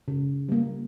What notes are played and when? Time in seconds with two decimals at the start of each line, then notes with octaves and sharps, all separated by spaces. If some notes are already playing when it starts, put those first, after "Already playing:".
0.08 C#3
0.49 G3 A#3